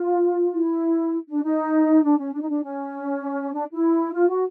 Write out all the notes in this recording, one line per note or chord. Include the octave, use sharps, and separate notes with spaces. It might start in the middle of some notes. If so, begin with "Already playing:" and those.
Already playing: F4
E4
D4
D#4
D4
C#4
D4
D#4
D4
C#4
D4
E4
F4
F#4